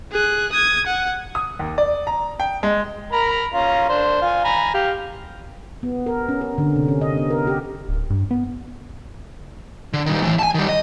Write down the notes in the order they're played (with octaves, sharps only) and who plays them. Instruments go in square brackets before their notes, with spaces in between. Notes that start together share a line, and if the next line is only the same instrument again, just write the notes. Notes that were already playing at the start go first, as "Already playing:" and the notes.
[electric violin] G#4 F#6
D#6 G#6
F#5
[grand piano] D#6
D#2
D5
A#5
G5
G#3
[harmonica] A#4 A#5 B5
C#4 F4 A#5
D4 C5
F4 G#5
G#5 A#5 B5
G4 F5
[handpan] B3
A#4
C#4
A#4
D3
C3
C#4
D#5
B3
A#4
G4
[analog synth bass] D1
G2
B3
[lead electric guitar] D3
D#3 G3
E3 A3
G#5 A5
D#3 G3
D#5